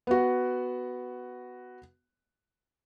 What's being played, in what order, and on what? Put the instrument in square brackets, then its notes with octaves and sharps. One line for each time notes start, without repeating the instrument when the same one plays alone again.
[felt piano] B3 F#4